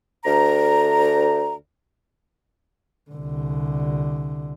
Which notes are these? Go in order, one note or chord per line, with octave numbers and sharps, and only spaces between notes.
D2 A#5
C2 D3